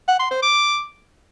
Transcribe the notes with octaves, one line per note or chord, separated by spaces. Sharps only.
F#5
C6
C5
D6